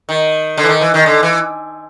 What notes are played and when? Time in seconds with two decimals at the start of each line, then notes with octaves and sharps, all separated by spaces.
0.09 D#3
0.57 D3
0.63 E3
0.69 D#3
0.81 E3
0.94 D#3
1.06 D3
1.23 E3